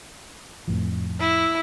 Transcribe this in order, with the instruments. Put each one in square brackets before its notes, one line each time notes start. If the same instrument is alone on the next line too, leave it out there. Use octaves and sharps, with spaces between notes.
[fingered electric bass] F2 A2 F3
[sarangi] E4